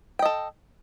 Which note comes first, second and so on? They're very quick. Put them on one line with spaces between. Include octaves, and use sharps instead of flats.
G5 D#5 A4